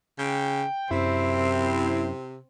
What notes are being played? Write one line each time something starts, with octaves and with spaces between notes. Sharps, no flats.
C#3 G5
F#2 C3 C4 E4